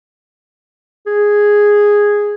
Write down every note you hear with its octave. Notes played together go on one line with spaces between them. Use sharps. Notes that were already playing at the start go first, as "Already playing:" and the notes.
G#4